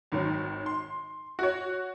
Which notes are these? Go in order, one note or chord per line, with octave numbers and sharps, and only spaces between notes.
G#1 D#3 F#3
C6
F#4 C#5